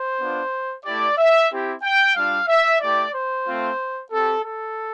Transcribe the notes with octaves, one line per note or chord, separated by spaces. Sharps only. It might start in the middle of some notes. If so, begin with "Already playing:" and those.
Already playing: C5
B3 D4 F4
A3 E4 G4 D5
E5
C4 E4 G4
G5
G3 D4 F4 F5
E5
A3 E4 G4 D5
C5
A3 C4 F4
C4 G4 A4
A4